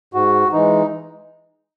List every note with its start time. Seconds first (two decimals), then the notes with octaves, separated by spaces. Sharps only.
0.14 G#2 F#4
0.52 E3 G#3 D#4